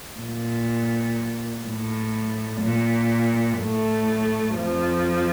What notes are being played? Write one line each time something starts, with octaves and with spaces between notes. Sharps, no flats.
A#2
A2
A#2
A2 A3
F2 F3